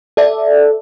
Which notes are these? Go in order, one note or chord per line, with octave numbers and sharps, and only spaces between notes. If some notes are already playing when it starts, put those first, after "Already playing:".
A4 D5 E5